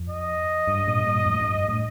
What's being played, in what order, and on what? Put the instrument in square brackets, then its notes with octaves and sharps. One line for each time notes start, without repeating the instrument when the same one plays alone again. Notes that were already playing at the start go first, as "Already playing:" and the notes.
Already playing: [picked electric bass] F2
[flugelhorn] D#5
[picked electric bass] G2
G2 A#2
G2 A#2
F2 A2
G2
G2
A2